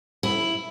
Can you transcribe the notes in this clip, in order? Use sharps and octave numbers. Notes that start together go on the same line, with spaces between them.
E4